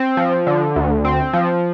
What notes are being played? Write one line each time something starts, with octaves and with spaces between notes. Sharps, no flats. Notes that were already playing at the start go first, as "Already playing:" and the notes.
Already playing: C4
F3
D3
D2
C4
F3